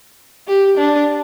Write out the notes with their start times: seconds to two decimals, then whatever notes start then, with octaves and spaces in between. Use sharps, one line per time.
0.48 G4
0.78 D4